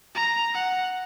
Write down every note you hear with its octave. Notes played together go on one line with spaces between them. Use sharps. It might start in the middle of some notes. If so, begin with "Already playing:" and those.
A#5
F#5